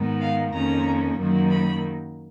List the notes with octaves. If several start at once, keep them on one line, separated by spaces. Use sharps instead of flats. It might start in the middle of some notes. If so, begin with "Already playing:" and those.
Already playing: G#2 D#3 G#3 B3
F5
F2 D#3 A#3 C#4 A#5
F#2 D#3 F#3 A#3
B5